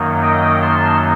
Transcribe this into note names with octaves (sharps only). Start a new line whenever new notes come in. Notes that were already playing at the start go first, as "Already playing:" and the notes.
Already playing: F#2 D#3 F#3 A#3 D#4
D#5 G5
A5 C6